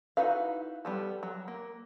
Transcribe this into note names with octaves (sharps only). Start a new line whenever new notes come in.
D#4 E4 F#4 B4 F5
G3 B3 A4
F#3
A#3